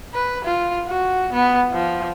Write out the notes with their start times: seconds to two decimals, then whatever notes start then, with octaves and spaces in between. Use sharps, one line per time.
0.14 B4
0.44 F4
0.87 F#4
1.33 B3
1.72 F3